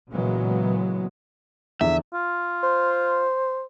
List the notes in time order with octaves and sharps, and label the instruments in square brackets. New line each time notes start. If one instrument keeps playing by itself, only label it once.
[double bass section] A#2 C#3 E3 F#3 G#3 B3
[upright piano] E2 D3 F3 [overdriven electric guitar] E5
[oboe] F4
[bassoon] C5